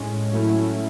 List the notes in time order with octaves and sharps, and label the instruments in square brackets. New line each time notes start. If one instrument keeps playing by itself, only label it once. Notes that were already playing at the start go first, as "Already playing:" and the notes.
Already playing: [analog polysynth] A2 G#3 C#4
A2 F#3 A3 C#4 E4